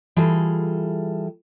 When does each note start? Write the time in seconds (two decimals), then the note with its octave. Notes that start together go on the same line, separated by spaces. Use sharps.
0.16 E3 G3 F4 G#4 A4